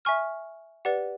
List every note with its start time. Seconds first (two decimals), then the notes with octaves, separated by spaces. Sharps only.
0.05 E5 G#5 C#6 F6
0.85 G4 B4 D5 F#5